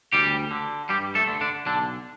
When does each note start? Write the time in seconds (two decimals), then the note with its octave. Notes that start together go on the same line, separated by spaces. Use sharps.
0.13 D2 G3 G4
0.51 D3
0.89 G2 G3 G4
1.15 A3 A4
1.27 D3
1.41 D3 D4
1.66 B1 D3 D4